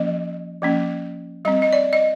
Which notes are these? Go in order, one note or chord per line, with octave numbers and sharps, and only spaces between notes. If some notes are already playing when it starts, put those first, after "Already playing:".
Already playing: F3 A#3 C#4 D#5
F3 A#3 C#4
G3 C4 D#5
D#5
D5
D#5